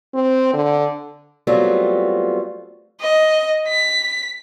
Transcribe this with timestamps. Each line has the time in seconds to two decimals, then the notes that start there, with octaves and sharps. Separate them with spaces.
0.14 C4
0.53 D3
1.47 F#3 G3 A3 B3 C4 F4
3.01 D#5
3.68 B6